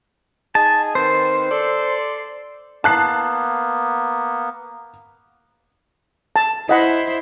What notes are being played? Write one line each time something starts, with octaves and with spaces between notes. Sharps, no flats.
D#4 G#4 G#5 A5
D#3 C4 B4 C5
A4 D5 C6
A#3 B3 A5 F#6 C7
A5
E4 C5 D#5 F#5 B5